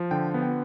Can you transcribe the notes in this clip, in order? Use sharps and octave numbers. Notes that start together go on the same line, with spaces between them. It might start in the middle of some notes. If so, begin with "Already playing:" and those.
Already playing: F3
D3 G5
B3
G5